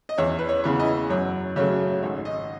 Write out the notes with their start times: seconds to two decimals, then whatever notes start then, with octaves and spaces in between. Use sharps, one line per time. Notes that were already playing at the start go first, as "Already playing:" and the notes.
0.09 D#5
0.18 E2 C#5
0.39 B4
0.49 C#5
0.64 C#3 E3 B3
0.80 D#5
1.10 F#2 C#5
1.56 C#3 F#3 A3 C#5
2.03 G#1 C#5
2.25 D#5